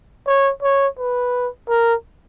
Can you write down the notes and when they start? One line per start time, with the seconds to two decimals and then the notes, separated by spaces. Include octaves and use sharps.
0.27 C#5
0.63 C#5
0.99 B4
1.69 A#4